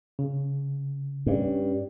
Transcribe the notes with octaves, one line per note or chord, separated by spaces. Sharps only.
C#3
G2 C#4